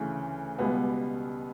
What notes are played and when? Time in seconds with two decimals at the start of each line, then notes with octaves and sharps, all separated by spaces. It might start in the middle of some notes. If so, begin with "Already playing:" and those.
Already playing: D2 C#3 E3
0.59 C#2 B2 G3 B3